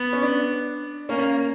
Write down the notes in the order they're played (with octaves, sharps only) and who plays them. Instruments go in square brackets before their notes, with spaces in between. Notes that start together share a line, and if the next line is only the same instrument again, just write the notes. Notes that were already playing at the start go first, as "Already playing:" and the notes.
Already playing: [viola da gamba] B3
[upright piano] C#4
D4
[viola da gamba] A#3 [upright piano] C#4